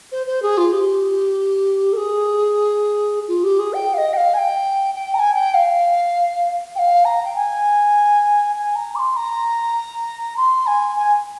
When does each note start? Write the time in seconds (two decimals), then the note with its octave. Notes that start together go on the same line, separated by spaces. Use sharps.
0.12 C5
0.26 C5
0.42 G#4
0.57 F4
0.72 G4
1.93 A#4
1.97 G#4
3.28 F4
3.43 G4
3.59 G#4
3.73 G5
3.93 F5
3.97 D#5
4.13 G5
4.17 F5
4.33 G#5
4.38 G5
4.94 G5
5.14 A#5
5.19 G#5
5.34 G5
5.54 F5
6.75 G5
6.79 F5
7.05 A#5
7.25 G5
7.35 G#5
8.56 G#5
8.75 A#5
8.95 D6
8.99 C6
9.16 A#5
10.37 C6
10.66 G#5
10.96 G#5